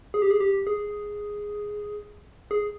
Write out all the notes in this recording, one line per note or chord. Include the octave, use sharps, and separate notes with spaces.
G#4
G4
G#4
G4
G#4
G#4